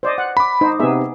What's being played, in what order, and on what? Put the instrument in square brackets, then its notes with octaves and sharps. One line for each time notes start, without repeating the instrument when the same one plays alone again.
[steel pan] C5 D5 D#5
F#5
[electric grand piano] B5 D6
[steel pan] D#4 C5
[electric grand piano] C3 D#4 [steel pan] B3 G#4 E5